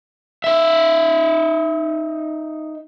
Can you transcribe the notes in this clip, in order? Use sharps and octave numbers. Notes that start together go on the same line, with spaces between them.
D#4 E5